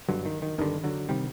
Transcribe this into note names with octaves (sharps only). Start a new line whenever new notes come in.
G1 G2 D3 F#3
D#3
D#3
G1 G2 D3 D#3
D3 F#3
C3 D#3 G3